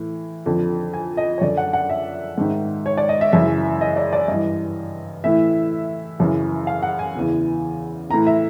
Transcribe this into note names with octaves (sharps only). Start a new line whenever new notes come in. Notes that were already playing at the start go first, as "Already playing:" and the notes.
Already playing: A2 E3
F2 D3
G#5
D#5
C#5
F#2 D3 D5
F#5
F#5
E5
G#2 D#3
C#5
D5
D#5
E5
F#2 C#3 E3 E5
D#5
D5
D5
G2 E3 D#5
A2 E3 E5
F#2 C#3 E3
F5
F#5
G#5
E2 C#3 E3
A2 E3 A#5
E5